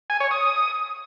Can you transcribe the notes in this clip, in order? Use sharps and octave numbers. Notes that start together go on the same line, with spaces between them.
G#5
C#5
D#6